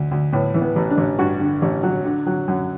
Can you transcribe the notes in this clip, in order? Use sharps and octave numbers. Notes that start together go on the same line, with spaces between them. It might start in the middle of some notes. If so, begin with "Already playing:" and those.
Already playing: D2
D2
A2 B3
E3
B3
A1
D4
A1
G2 F#4
D3
A1
F#3
D3
F#3
F#2